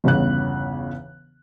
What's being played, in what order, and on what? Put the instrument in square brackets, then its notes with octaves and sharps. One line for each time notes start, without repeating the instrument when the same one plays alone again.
[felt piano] G1 E2 C#3 B3 F#6